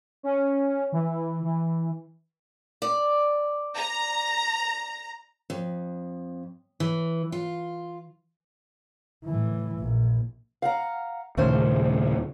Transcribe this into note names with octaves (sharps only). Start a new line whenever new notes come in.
C#4
E3
E3
D5
A#5
F2
E3
F4
A2 E3
A#1
F5 F#5 A#5
D#2 A#2 C#3 A3 C#4 C5